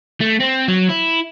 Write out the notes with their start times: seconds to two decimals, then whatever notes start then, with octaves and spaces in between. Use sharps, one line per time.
0.21 A3
0.40 C4
0.68 F#3
0.89 E4